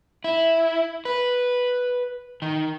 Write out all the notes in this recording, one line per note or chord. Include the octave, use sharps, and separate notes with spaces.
E4
B4
D#3